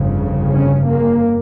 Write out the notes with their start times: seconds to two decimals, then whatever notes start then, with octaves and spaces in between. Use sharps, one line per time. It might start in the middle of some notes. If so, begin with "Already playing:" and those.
Already playing: G1 F2 C#3
0.53 C#4
0.86 A#3